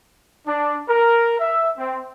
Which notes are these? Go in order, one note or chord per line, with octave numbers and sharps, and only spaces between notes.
D4
A#4
E5
C4